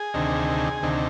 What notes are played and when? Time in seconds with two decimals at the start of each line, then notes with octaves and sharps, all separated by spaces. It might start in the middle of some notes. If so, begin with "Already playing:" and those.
Already playing: G#4
0.14 D2 C3 D#3
0.83 D2 C3 D#3